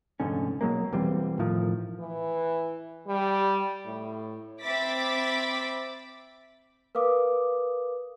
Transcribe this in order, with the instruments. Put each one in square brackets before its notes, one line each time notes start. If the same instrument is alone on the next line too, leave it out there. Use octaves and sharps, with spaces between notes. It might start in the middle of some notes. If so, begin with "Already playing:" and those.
[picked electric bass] F1 G#2 D3 C#4
B2 F#3 G#3 A#3
E1 E3 G3 C4
A2 D#3 F3
[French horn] E3
G3
A2
[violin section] C4 E5 B5 D6 A6 B6
[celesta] A#4 B4 F5 D6 D#6